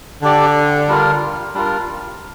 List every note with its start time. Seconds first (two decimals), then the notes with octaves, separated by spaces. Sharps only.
0.22 D3 D4 G4 D5
0.88 G3 D4 F4 A#4
1.54 G3 D4 F4 A#4